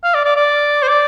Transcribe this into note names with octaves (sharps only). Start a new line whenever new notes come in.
F5
D5
D5
D5
C5
D5